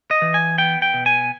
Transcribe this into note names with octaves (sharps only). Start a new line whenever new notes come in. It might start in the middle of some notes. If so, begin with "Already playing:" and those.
D#5
E3
G#5
B3 G5
G5
B2
G#5